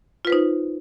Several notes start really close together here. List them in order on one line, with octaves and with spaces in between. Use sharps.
F4 B4 C5 D#4